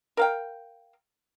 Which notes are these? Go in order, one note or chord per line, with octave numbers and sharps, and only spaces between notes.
A#4 F5 G5